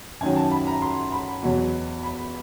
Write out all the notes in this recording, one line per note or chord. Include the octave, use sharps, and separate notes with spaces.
F#2 D#3 F#3 G#5
A5
B5
A#5
C6
B5
E2 B2 F#3
B5